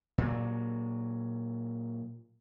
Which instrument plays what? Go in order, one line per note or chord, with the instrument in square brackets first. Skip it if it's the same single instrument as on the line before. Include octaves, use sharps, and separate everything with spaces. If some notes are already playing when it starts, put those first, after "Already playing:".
[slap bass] A#2 F#3